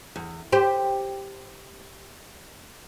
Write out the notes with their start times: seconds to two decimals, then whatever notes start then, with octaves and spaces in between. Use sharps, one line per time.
0.16 E2
0.52 G4 C5